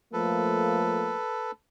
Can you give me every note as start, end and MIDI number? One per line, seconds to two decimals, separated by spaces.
0.13 1.17 53
0.13 1.17 57
0.13 1.17 58
0.13 1.51 69
0.13 1.51 71